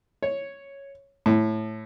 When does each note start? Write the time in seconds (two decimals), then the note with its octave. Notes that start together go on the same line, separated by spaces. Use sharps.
0.23 C#5
1.26 A2